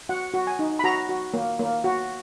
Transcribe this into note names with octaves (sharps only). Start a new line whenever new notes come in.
F#4 F#5
F#4
G#5
D#4
B5
F#4 A#5
F#4
A#3
A#3
F#4